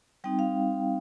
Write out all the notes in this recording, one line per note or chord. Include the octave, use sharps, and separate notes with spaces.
G3 C4 D#4 G5
F5